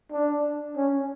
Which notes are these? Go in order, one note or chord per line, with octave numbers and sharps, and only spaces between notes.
D4
C#4